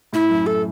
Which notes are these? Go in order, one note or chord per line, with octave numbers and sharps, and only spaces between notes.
A2 E4
F#2
A4